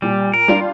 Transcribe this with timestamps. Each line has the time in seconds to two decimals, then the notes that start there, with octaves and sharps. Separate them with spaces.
0.02 A#2 G3
0.33 A#4
0.48 G3 D4 F4